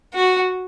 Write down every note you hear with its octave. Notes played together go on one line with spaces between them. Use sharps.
F#4